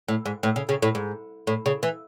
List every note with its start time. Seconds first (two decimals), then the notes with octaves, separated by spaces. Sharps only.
0.08 A2
0.26 G#2
0.43 A2
0.56 C#3
0.69 C#3
0.82 A2
0.95 G#2
1.47 A2
1.66 C#3
1.83 E3